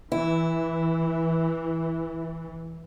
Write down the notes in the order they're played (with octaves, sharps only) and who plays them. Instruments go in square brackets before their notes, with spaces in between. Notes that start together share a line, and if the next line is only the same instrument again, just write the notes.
[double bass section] E3 [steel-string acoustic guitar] E4